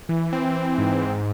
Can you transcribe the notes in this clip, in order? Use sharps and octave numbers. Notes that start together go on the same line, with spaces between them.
E3
C4
C4
G#2
G#2